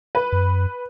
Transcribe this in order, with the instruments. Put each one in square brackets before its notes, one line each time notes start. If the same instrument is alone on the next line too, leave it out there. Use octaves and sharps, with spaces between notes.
[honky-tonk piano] B4
[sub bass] F#2